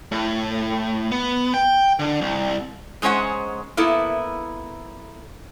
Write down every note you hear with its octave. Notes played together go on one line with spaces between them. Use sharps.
A2
B3
G5
D3
C2
G#2 G#3 C#4 C5 F#5
A#3 B3 E4 A4